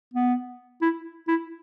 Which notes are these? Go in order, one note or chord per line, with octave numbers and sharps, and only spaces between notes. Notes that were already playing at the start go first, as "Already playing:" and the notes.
B3
E4
E4